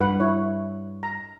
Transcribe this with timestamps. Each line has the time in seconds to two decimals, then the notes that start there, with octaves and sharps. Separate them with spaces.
0.01 G2 B4 F#5
0.20 E4 C#5
1.03 A#5